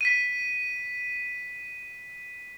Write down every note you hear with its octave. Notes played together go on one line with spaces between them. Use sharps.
B6 D#7